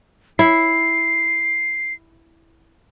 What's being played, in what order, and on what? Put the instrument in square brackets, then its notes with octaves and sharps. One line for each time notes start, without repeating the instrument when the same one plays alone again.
[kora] E4 [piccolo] C7